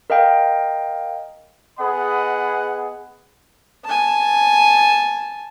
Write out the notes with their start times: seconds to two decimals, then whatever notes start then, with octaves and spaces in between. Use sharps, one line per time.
0.10 A#4 D#5 F5 G5
1.79 B3 G#4 D#5 F#5 B5
3.85 G#5 A5